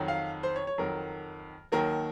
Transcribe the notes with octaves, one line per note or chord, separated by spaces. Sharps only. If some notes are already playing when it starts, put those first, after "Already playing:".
Already playing: F2 D#3 F#3
F5
C5
C#5
C#5
F2 D#3 F#3 A#4
D#2 D#3 F#3 A#4